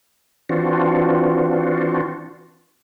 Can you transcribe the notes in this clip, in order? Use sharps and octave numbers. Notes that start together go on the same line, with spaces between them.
E3 C4 D4 F4 F#4